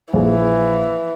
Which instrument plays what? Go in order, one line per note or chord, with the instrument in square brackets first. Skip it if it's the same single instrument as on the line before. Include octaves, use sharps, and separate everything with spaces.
[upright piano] A#1 G#4 [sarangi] E3